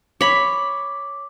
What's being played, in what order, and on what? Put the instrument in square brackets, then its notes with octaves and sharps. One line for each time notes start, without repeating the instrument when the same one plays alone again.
[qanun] C#5 B5 [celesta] D6